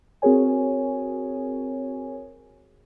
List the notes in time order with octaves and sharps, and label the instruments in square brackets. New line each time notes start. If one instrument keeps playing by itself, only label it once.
[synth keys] C4 F#4 G#4 A#4 C#5 G#5